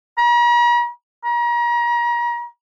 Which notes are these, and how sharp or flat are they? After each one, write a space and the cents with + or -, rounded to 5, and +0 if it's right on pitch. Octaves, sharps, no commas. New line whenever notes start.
A#5 +45
A#5 +35